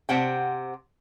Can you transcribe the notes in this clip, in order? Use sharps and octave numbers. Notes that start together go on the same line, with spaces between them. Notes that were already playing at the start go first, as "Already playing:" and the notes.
C3 C5 F#5 G5